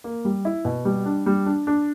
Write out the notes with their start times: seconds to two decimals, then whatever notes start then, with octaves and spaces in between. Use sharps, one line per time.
0.04 A#3
0.25 G3
0.45 E4
0.65 B2
0.85 G3
1.06 D4
1.26 G3
1.46 D4
1.67 D4